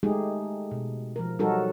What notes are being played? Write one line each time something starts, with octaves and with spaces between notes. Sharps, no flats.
G#3 A3 D#4 G4 G#4
B2
F3 A#4
F#3 G3 D#4 F#4 A4 A#4